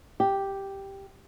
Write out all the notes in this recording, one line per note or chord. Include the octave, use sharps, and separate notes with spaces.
G4